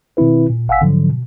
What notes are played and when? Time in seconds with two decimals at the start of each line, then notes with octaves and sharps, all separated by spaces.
0.17 B2 D#3 C4 E4 B4
0.50 A#2
0.68 G1 F5 F#5 G#5 E6 B6
0.81 G#2 D3 F3 F#3
1.09 B2